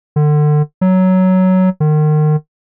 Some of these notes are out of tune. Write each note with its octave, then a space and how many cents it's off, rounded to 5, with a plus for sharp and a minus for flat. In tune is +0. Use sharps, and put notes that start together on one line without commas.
D3 +30
F#3 +10
D#3 -35